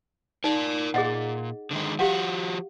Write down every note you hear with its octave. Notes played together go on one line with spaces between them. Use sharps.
D#4 A#4 D5
A#2 G#4 D#5 F#5
D3 D#3 G#3
F3 F#4 G4 F5 F#5